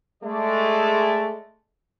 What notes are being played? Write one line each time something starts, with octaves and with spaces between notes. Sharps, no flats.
G#3 A3 D5